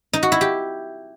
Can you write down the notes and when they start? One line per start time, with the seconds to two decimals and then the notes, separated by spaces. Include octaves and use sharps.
0.13 D#4
0.23 F#4
0.32 E4
0.41 G4